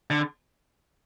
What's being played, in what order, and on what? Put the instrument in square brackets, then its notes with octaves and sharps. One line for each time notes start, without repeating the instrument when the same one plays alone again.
[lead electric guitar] D3